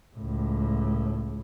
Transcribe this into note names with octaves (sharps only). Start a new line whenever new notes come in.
C#2 A2